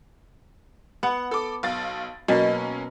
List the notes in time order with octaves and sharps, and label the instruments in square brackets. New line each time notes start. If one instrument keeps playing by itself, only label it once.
[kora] B3 [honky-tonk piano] F#5
[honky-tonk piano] A4 D6
B1 F5 A6
[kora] B2 [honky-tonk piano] F#3 A#3 C#4